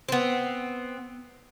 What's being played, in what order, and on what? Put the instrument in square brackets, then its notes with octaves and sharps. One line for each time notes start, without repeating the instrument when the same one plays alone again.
[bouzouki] B3 C4